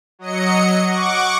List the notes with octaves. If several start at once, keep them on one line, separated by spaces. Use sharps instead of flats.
F#3 D#5 C#7
F#5 C#6 D6